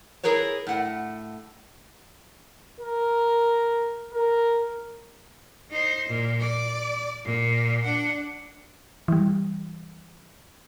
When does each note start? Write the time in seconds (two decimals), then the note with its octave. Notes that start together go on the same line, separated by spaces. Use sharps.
0.23 E4 G#4 A#4 B4 C#5
0.67 A2 F#5
2.80 A#4
4.13 A#4
5.71 D#4 C5
6.08 A#2
6.40 D5
7.25 A#2
7.83 D4 F#5
9.08 E3 G3